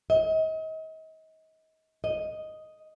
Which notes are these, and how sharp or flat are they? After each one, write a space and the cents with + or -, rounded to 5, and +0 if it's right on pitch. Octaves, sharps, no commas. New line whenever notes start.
D#5 +35
D#5 +0